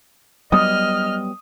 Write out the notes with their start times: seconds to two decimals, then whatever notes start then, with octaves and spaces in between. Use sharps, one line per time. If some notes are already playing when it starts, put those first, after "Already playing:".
0.52 F#3 G3 B3 D#5 D#6 F6